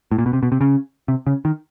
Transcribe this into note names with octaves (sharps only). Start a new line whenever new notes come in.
A2
A#2
B2
C3
B2
C3
C#3
C3
C#3
D#3